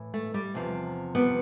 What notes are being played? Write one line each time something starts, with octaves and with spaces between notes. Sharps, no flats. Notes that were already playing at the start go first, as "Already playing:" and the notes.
Already playing: A2 E3
A3
G3
E2 C3 F3
G3 B3